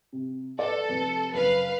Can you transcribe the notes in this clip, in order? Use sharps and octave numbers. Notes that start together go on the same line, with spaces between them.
C3
A4 B4 D5
F1 B4
F#1 B4 F5